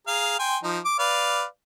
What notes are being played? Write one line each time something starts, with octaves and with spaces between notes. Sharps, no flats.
G#4 F5 A#5
G5 G#5 C6
F3 D#4
D6
B4 D5 F5